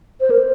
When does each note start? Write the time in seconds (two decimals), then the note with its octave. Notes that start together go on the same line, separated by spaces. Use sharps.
0.21 C5
0.30 A#4
0.39 C5